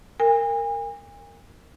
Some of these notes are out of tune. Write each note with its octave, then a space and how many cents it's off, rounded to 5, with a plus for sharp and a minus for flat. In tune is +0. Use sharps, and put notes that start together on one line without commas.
A#4 -15 G#5 -40